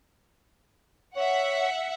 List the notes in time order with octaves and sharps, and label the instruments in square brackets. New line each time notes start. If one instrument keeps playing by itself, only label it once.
[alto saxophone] C#5 [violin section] E5 F#5